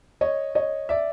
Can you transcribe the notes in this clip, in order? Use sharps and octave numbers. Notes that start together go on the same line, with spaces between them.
C#5 D#5
C#5 D#5
D5 E5